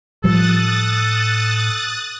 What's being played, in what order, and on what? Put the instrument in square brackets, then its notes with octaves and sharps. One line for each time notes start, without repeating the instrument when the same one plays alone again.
[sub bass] A2 [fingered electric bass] F3 G3 [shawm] A4 [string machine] D#6 F#6 A6